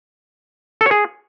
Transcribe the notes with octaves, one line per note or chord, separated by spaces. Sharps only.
A4
C#5
G#4